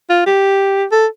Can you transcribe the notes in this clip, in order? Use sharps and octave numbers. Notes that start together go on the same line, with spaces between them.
F4
G4
A4